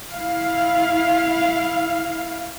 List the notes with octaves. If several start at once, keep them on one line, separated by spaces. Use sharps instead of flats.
E4 F5